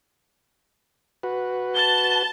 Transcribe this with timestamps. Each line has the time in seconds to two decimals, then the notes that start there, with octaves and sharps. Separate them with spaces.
1.23 F#4 B4
1.75 A5 G7